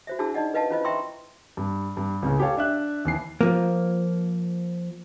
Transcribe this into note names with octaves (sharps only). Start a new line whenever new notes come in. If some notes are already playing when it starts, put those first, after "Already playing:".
F#4 C5 E5
D4 E4 F#4 G#4 A5 E6
D#4 D5 D#5 F#5
A#4 B4 D#5 F5 F#5 A5
C#4 E4 F4 B4 C5 D#5
E5 G5 A#5 C6 C#6 E6
G2
G2
C#2 A2 C#3
G4 A4 C#5 F5 A5
D4 E5 F#6
D#2 E3 C7
F3 A#3